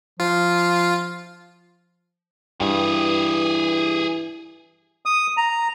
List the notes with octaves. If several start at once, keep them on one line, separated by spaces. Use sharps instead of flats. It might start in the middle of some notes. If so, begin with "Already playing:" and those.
F3 F4
G2 E3 G4 G#4
D#6
A#5